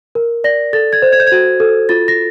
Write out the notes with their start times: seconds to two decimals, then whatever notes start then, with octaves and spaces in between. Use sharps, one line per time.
0.15 A#4
0.44 D5 A#6
0.73 A4 A6
0.93 G#6
1.02 C5
1.12 G#6
1.20 G6
1.27 F#4 G#6
1.60 A4
1.89 F4 A6
2.08 A#6